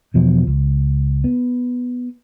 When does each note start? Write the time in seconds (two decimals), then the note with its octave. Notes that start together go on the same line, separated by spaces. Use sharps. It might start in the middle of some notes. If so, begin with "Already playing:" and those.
0.14 E2 B2 F3
0.47 C#2
1.24 B3